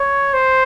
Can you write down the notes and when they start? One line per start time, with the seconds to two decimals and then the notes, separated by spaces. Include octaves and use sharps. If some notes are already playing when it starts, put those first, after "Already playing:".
Already playing: C#5
0.34 C5